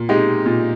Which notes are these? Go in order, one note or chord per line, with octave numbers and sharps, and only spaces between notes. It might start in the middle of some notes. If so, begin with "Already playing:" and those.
Already playing: A#2
G#3 D#4 G4
A#2